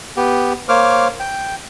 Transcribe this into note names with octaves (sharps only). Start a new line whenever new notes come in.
B3 G4
A#3 C5 C#5 D6 F6
G5